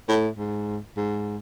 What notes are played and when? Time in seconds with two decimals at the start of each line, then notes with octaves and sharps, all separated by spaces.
0.08 A2
0.38 G#2
0.97 G#2